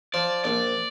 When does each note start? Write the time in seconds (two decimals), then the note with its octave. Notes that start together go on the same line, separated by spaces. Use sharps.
0.14 F3 D5
0.44 A#1 D5